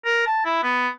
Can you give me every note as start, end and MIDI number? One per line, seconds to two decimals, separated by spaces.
0.05 0.25 70
0.26 0.43 81
0.45 0.63 64
0.63 0.88 59